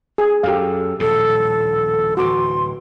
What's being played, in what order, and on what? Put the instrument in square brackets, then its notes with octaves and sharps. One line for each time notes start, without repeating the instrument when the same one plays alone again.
[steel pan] G#4
[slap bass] F#2 F#3 [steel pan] G4 F5 [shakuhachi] A4
[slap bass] D#1 A#1 A2 [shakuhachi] A4
[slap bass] D1 E3 [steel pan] F#4 D6 [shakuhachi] C6